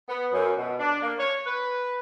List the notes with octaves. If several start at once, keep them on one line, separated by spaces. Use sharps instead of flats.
B3
F#2
B2
D4
A#3
C#5
B4